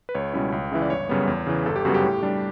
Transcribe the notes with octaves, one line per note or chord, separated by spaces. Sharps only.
B4
C#2 C#5
B2 G3 C#4 E4
C#2
C#3 E3 E5
D5
G1 C#5
F#2 C#3 G3 B3
E2
C#3 E3
G1 A4
G4
F#2 C#3 G3 B3 F#4
G4
A2
G3 D4